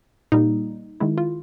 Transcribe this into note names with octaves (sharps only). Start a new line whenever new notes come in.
A#2 G3 A#3 D#4
D#3 G#3 E4
F4